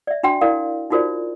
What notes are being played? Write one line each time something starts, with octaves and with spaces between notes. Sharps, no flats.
D5 E5
D4 F#4 G5 C6
E4 A#4 D5 F5
D#4 F4 F#4 A#4 C5 D5